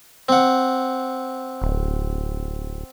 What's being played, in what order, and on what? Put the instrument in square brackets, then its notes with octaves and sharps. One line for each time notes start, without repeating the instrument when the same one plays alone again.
[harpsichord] C4 F#5
[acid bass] D1